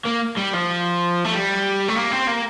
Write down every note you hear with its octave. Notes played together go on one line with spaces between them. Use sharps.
A#3
G3
F3
A3
G3
A3
A#3
C4
A#3